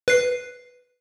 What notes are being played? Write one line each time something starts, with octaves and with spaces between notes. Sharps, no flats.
B4 C7